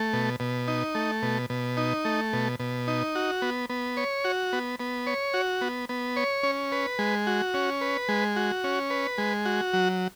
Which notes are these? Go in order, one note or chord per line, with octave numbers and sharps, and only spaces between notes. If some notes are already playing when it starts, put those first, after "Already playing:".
Already playing: A3
B2
B2
D#4
A3
B2
B2
D#4
A3
B2
B2
D#4
F#4
B3
B3
C#5
F#4
B3
B3
C#5
F#4
B3
B3
C#5
C#4
B4
G#3
F#4
C#4
B4
G#3
F#4
C#4
B4
G#3
F#4
F#3